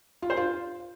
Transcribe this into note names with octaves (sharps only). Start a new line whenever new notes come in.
F4
C5
F4